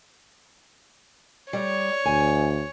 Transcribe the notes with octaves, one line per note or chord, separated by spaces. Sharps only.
G3 C#5
D2 G#5